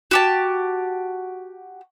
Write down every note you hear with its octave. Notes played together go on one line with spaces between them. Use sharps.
F#4 G4 A5